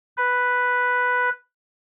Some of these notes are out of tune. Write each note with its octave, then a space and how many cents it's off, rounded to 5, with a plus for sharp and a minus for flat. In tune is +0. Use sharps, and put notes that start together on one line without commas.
B4 +0